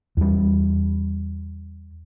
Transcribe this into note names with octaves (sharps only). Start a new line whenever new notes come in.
E2 G3